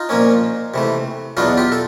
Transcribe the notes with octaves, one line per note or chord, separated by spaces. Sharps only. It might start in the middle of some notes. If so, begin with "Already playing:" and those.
Already playing: D#4 F4
A#2 F3 A#3 C#4
C3 E3 A3
E2 B2 F#3 B3 D4 D#4 F4
F4 G4
A4